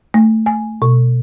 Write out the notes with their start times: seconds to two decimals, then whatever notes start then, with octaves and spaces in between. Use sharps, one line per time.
0.14 A3
0.46 G#5
0.82 B2